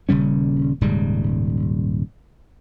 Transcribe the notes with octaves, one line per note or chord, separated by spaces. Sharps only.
D#1 C#3 G3 C#4
D#1 G#2 C#3 G3